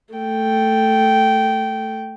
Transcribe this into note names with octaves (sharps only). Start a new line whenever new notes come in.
A3 G5